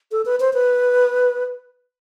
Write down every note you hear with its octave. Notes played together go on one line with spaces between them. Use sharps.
A4
B4
C5
B4